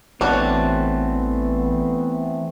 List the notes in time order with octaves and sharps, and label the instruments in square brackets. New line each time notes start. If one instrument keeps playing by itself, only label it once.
[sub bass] A1 [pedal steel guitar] E3 A3 C4 [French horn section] B3 [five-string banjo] D4 F#4 C#5